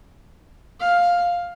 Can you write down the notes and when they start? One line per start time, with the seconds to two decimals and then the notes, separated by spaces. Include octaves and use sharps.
0.80 F5